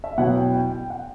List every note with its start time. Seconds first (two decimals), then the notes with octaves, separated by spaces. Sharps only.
0.04 E5
0.18 B2 F#3 B3 E4 F#5
0.36 G5
0.54 G5
0.72 G5
0.90 F#5